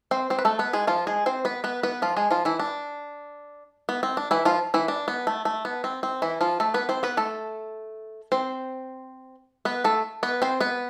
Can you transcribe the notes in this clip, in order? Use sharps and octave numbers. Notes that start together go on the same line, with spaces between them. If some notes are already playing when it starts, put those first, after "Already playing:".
C4 C5
C4 C5
B4
A3 A4
B3 B4
G#3 G#4
F3 F4
G#3 G#4
C4 C5
B3 B4
B3 B4
B3 B4
F3 F4
G#3 G#4
F3 F4
E3 E4
D4
B3
C4
D4
E3 E4
F3 F4
E3 E4
D4
B3
A3
A3
B3
C4
C4
E3 E4
F3 F4
A3 A4
B3 B4
C4 C5
B3 B4
A3 A4
C4 C5
B3 B4
A3 A4
B3 B4
C4 C5
B3 B4